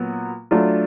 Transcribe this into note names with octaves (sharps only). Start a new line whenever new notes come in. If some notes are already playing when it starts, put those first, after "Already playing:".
Already playing: A#2 F#3 B3
F#3 A3 D4 F4